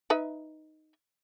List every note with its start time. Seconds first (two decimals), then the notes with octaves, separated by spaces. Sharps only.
0.10 D#4 B4 E5